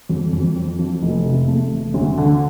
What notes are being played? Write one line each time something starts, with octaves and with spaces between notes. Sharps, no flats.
F2
F2
C4
F3
F1
C3
A3
F1
D2
D3